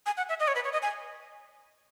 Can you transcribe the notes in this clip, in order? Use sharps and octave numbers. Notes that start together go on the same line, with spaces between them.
G#5
F#5
E5
D#5
C#5
B4
C#5
D#5
G#5